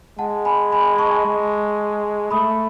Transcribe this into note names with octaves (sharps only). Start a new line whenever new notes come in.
G#3 F#5 A5
G#5 B5
G#5 B5
A5 C#6
G#3
A3 B5 D#6